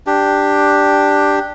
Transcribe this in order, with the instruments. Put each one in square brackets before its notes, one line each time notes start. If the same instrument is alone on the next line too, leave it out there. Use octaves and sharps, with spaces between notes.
[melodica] D4 G4